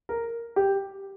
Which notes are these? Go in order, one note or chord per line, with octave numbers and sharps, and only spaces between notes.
A#4
G4